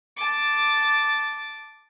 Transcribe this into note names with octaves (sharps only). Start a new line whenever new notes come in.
A5 D6